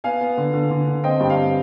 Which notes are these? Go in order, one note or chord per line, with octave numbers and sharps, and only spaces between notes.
B3 F5 G#5
B3
D3
D3
D3
D3
C4 D#5 G5
G2 G5
F5
C4